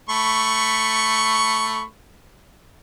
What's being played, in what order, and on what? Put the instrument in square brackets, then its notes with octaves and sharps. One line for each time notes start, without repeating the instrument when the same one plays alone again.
[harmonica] A3 B5 C#6